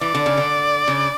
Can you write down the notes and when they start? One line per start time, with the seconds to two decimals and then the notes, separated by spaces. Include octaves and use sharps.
0.01 E3 D5
0.15 D3
0.26 C#3
0.37 D3
0.88 C#3